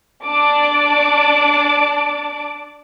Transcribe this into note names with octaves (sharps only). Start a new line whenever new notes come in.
D4 D5 A5 D6